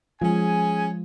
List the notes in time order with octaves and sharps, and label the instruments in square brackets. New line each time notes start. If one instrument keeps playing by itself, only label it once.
[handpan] F3 G#3 F4 [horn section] C#4 G#4 G#5